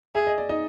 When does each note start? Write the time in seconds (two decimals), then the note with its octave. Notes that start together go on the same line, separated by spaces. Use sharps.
0.15 G#4 E5
0.27 D#5
0.38 D5
0.49 D#4 D#5